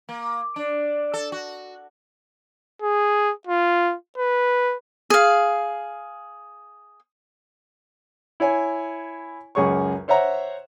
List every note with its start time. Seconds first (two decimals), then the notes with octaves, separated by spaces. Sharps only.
0.09 A#3
0.56 D4
1.14 A4
1.32 F#4
2.82 G#4
3.47 F4
4.18 B4
5.10 G#4 F5
8.40 E4 C#5 G#5
9.55 C#2 F#2 G#4 C#5 C#6
10.08 C5 C#5 E5 F#5 A#5